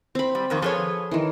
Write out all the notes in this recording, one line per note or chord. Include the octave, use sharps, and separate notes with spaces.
C4 B5
G3
F2 D#3 A#3
F3 G#4 A4 B4 C#5 C6
D#3 E3